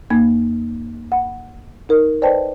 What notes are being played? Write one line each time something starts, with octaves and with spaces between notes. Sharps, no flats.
F2 A#3 B5 G#6
F#5 B5
D#4 A#4
B4 C5 D5 D#5 G5 A5